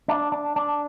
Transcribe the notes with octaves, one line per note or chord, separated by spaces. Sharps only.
D4
D4
D4